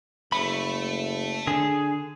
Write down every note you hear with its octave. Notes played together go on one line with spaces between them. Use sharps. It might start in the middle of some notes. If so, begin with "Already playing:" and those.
F#1 A3 B5
D3 G#4